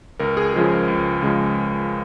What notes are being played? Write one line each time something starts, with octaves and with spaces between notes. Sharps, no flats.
C#2 A#4
G#4
C#3 F3 G#3 G#4
A#4
C#2
C#3 F3 G#3